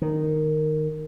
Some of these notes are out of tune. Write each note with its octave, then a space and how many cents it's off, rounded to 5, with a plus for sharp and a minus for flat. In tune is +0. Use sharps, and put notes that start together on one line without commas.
D#3 -10